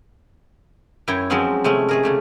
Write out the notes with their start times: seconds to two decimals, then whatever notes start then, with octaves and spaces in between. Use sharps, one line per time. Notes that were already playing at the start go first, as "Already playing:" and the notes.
1.08 F#2 E4 C#5 G5
1.30 F3 F#3 G#3 C4 C#4 D#4
1.64 C3 G#3 A3 C#4
1.89 A3 G#4 A#4
2.03 C#3 A3 G4